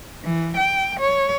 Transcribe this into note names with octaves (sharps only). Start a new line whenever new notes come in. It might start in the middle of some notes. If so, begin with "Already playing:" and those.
E3
G5
C#5